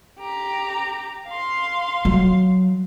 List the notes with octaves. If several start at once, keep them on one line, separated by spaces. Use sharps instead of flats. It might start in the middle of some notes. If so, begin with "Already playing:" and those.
G4 A#5
F5 C6
F#3